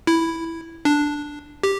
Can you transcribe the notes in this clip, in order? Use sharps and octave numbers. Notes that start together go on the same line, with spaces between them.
E4
D4
G4